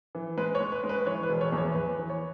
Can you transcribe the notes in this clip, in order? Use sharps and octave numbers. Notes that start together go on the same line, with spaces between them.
E3
G#3 B4
C#5
G#3
B4
G#3
B4
B4
E3 C#5
B4
E1
C#5
E2
C#5
E2 B4
E3
C#5